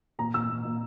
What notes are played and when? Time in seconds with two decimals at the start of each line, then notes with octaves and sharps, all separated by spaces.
0.19 A#2 A#5
0.34 A#2 E6
0.49 A#2
0.65 A#2